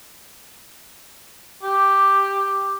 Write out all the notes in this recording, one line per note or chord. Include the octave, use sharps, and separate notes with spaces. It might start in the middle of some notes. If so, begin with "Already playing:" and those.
G4